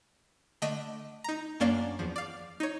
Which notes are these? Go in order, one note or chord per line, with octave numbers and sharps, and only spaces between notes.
D3 A3 D#5 B6 D7
D#4 A#5
F#2 A#3 C#4 D4 D5 F5
E2 F3
D5 F5
D#4 C#5